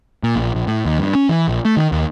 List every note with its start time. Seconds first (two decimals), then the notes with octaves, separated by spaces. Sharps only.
0.23 A#2
0.36 A#1
0.55 A#1
0.67 A2
0.85 D#2
0.99 G2
1.15 C#4
1.29 E3
1.48 A#1
1.65 A3
1.77 D#3
1.92 D#2